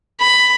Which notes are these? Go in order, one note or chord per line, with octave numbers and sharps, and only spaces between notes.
B5